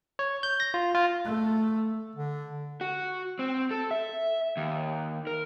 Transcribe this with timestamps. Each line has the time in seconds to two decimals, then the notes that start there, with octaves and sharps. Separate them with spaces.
0.19 C#5
0.43 G6
0.60 A#6
0.74 F4
0.95 F4
1.25 A3
2.16 D3
2.81 F#4
3.39 C4
3.71 A4
3.91 E5
4.57 D#2
5.27 A#4